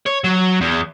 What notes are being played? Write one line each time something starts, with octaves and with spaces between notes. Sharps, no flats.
C#5
F#3
E2